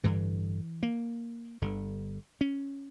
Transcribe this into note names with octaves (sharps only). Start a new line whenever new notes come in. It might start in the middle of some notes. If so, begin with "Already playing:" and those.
A1 G2 D3 E3
A#3
G1 G2 D3
C#4